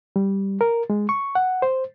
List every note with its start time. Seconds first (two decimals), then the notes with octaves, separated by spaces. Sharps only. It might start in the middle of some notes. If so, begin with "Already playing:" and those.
0.16 G3
0.61 A#4
0.90 G#3
1.09 C#6
1.35 F#5
1.62 C5